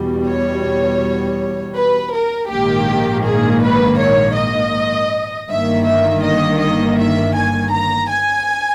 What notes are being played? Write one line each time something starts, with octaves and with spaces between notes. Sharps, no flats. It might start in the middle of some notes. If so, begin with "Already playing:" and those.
Already playing: E2 B2 G3
C#5
B4
A#4
A#1 G#2 D#3 A#3 G4
G#4
B4
C#5
D#5
G1 G2 D#3 A#3 E5
E5
D#5
D#5
E5
G#5
A#5
G#5